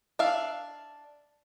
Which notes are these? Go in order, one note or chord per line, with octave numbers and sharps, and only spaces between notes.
D4 E5 F5